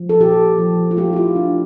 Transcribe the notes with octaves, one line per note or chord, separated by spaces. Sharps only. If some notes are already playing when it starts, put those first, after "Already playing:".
Already playing: F3
A4
A#2 G4
F3
F4
A3 G4
E4
F4
A3 D4